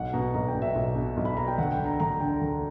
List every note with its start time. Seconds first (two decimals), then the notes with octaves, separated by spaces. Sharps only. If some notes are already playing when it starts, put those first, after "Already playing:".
Already playing: B1 F#5
0.13 B2 A#5
0.34 B1 A#5
0.48 G5
0.55 B2
0.62 E5
0.75 B1
0.96 B2
1.17 B1
1.25 B5
1.37 B2 A#5
1.47 G5
1.58 D2 F#5
1.72 G5
1.79 D3
1.86 A#5
2.00 D2 A#5
2.20 D3 G5
2.41 D2